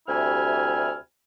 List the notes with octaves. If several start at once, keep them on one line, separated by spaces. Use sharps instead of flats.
D2 C3 G3 E4 G#5 F6